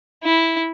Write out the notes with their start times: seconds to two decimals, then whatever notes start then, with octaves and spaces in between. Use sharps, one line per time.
0.23 E4